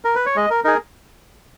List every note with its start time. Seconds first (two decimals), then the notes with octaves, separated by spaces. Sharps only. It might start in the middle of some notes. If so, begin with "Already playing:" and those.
0.05 A#4
0.15 B4
0.26 C#5
0.36 G#3 D#5
0.50 A#4
0.64 D#4 G#4 A#4